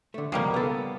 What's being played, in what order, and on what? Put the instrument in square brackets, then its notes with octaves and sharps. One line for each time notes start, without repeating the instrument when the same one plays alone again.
[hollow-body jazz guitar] D3 A3
[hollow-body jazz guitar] C#2 B2 [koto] F3 G3 A#3
[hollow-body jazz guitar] B3 A4